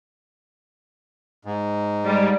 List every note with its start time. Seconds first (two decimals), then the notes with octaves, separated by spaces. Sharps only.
1.45 G#2
2.05 G3 G#3